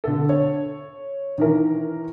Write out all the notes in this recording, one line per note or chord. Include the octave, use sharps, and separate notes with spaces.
D3 A4
C#5
D#3 E3 A#4